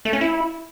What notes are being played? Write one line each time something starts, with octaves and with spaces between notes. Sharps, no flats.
A3
C#4
E4